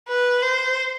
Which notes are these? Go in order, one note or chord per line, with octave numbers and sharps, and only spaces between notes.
B4
C5